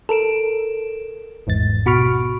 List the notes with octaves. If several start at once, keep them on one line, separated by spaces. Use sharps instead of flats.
A4 A#4 D7 E7
G#1 E2 G#2 A6
B2 F#4 B5 C#6 F6 D7